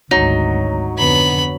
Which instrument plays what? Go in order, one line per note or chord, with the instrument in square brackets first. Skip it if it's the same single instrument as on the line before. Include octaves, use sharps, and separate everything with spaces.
[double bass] G#1 D2 [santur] F#3 [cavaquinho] D#4
[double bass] F2 D3 [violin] B3 B5